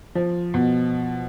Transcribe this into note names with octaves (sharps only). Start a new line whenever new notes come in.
F3
B2